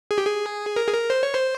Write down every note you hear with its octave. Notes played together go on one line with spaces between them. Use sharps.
G#4
G4
G#4
A#4
G#4
A#4
C5
C#5
C5